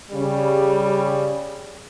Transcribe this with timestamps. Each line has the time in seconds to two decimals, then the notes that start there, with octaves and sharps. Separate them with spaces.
0.12 C#3 G3